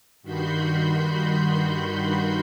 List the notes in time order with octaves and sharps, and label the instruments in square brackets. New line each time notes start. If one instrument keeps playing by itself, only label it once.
[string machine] G2 D#3 F#4 B5 C6 G6